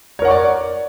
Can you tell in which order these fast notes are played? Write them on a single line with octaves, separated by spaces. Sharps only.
C#5 A#4 F#5 C#6 D5